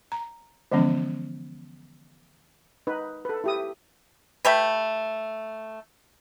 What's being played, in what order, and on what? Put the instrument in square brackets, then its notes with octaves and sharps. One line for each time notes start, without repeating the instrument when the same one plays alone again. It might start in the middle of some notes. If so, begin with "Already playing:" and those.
[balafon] A#5
D3 E3 F3 G#3 B3 C#4
[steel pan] D#4 B4
A4 B4
E4 G4 D#6
[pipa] A3 G4 B4